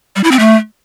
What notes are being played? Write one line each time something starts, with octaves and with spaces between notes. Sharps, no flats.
G3
E4
C4
A3